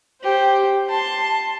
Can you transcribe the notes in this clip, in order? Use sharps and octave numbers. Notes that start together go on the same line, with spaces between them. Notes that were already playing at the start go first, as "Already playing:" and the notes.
G4 C5
A5 C6